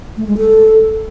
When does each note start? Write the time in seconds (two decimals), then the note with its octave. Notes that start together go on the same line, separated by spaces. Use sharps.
0.17 A3
0.27 G#3
0.37 A4